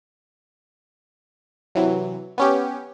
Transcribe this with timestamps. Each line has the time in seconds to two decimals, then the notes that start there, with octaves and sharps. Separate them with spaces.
1.75 C3 E3 F#3
2.38 B3 C#4 G4